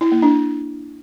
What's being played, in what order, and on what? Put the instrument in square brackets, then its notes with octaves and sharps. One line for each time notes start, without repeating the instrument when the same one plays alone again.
[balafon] E4
A#3
D4